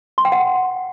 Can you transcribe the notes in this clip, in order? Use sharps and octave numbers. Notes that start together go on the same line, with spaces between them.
C6
G5
F#5